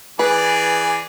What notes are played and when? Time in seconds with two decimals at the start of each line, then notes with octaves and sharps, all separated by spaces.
0.19 E3 G#4 B4 D5